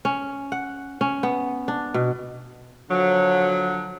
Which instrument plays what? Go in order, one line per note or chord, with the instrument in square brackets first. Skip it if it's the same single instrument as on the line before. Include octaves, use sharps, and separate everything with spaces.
[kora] C#4
F#5
C#4
B3
D4
B2
[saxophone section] D3 F3 F#3